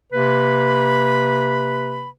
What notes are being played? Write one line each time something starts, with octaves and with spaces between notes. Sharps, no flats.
C3 A#3 B4 B5